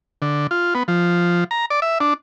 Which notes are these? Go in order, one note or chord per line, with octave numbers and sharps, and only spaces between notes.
D3
F4
B3
F3
A#5
D5
E5
D4